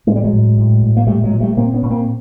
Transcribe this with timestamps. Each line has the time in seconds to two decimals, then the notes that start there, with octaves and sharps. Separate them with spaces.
0.07 A2 G#3
0.16 G3
0.24 F#3 G#3
0.32 A2
0.57 A2
0.82 A2
0.96 A#3
1.07 A#2 G3 A3
1.24 F#3 G#3
1.32 A#2
1.40 G3 A3
1.57 A#2 A#3 C4
1.73 B3 C#4
1.82 A#2
1.90 A#3 C4